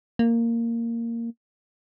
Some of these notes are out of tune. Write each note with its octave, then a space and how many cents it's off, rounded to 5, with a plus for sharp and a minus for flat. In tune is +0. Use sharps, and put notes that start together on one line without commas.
A#3 -10